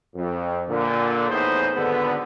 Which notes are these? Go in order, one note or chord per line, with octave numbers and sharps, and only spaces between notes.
F2
A#2 D3
E2 A2 B3 D#4 G#4 C5
G#1 D3 B3